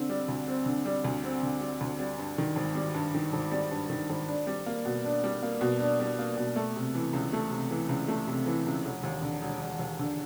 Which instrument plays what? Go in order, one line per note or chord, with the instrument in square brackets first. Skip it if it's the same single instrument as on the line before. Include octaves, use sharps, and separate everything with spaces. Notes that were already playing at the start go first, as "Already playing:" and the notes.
Already playing: [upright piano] D3 C4
G3
D2
C4
D3
G3
D2
C4
D3
G3
D2
G3
G2
D#3
G#1
G3
G2
D#3
G#1
G3
G2
D#3
G#1
D4
G3
A#3
B2
D4
G3
A#3
B2
D4
G3
A#3
B2
A3
C3
E3
C#2
A3
C3
E3
C#2
A3
C3
E3
C#2
E1
D#2
D3
E1
E1
D#2
D3